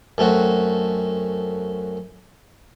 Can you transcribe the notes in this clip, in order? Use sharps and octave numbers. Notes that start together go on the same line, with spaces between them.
F#2 A3 C4 F#4